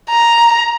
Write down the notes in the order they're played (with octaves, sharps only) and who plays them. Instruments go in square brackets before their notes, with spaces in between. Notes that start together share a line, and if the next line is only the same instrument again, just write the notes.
[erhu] A#5